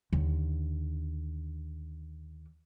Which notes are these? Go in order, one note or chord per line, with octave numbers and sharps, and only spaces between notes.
D#2 D3